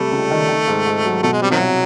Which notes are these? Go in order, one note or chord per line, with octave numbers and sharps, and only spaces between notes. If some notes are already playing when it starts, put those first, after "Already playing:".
Already playing: C3 G3 A3
C#2
D#3
D#3
G#2
G#2
F#3
B2 A3
G#3
G3 C4
D#3 F#3
C2